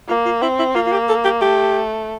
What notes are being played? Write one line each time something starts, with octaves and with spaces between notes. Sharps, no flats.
A#3 F4
F4
C4 E4
E4
A#3 F4
F4
G4
A4
G4
A3 G4